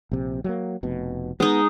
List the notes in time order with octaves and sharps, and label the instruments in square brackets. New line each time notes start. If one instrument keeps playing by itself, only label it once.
[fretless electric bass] A#1 C3
F#3 A3 A#3
F1 B2
[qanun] G#3 D#4 [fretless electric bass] B3